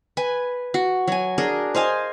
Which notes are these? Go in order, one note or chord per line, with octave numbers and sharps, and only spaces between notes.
B4 G#5
F#4
F#3 G#5
D4 G#4 A#4
C5 D#5 F5 G#5